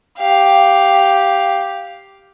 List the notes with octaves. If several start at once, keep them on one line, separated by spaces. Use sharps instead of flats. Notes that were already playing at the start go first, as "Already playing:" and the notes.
G4 F5